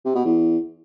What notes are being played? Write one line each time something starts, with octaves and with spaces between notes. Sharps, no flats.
C3
B2
E2